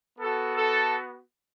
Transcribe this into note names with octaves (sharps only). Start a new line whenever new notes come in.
B3 F#4 A4
A4